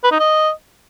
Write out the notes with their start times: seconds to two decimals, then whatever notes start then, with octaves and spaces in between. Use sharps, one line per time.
0.04 B4
0.12 D#4
0.20 D#5